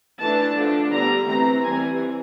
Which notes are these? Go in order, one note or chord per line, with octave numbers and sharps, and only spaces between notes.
E3 A3 D4 A5
D3 F3 A3 D4
D3 G3 B3 A#5
E3 A3 C4 A#5
E3 G3 C4 G#5